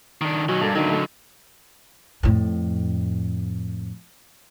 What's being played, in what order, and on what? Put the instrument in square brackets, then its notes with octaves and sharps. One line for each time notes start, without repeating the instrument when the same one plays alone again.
[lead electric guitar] D#3 D4
[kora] B2 C#4 [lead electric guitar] D#3 F#3
[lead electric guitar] G2 [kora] A#3 D4 A4
[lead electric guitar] D3 F#3 [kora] D#3 A#3
[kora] A3 E4
[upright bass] F2 A2